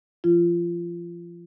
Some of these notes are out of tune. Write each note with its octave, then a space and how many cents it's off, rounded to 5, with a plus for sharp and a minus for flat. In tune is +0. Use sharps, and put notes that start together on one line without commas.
F3 -25 F4 -25